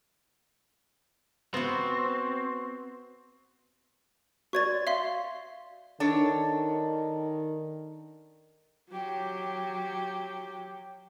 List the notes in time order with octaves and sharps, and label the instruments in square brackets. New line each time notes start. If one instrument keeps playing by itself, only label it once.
[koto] B3 F#4 [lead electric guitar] C4
[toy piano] F#4 C#5 D5 [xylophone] C#6 G#6 A6
[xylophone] E5 F5 C6
[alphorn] D#3 [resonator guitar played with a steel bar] D4 A4 C#5
[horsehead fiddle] F#3 G4